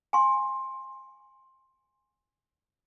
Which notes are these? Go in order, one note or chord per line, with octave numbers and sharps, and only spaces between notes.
G#5 C6